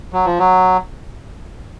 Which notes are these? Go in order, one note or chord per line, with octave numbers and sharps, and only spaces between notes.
F#3
F3
F#3